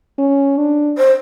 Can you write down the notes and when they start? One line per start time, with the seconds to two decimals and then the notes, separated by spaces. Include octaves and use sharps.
0.19 C#4
0.58 D4
0.98 C5